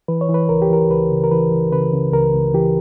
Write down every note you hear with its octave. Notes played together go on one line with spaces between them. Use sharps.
E3 B4
C#5
E3
B4
C#2 A#4
G4
E3 A#4
C#2 B4
C#3
A#4
E3 B4
E3
C#3 B4
C#3
C#2 A#4
C#2
E3 G4